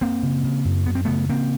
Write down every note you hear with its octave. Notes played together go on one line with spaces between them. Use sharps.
F#2 A#3 C4
C#3
C#3
F#2
F#2 B3
C4
C#3 A3 B3
C#3 A#3 C4